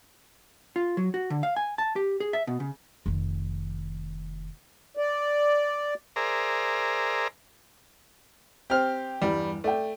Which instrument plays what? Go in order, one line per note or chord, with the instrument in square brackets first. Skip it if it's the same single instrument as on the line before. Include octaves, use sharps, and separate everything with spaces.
[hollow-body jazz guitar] F4
F#3
F#4
D3
F5
G#5
A5
G4
G#4
E5
B2
C#3
[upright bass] F1 D#3
[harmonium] D5
[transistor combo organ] G#4 A#4 C5 D5 E5 A#5
[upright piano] C4 C5 [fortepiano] G4 F6
[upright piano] E2 G2 [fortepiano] G3
[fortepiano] A3 [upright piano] D5 G5